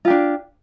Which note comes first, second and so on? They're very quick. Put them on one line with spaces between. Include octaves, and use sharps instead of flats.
F4 G4 D4